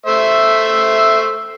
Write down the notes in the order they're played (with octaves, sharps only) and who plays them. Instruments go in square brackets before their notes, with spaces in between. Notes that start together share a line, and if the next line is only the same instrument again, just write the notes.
[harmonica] A3 C5 E5